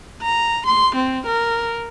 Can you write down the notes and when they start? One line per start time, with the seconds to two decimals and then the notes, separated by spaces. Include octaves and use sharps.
0.22 A#5
0.67 C6
0.96 C4
1.26 A#4